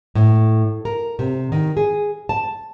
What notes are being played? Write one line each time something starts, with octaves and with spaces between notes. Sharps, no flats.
A2
A#4
C3
D#3
G#4
A5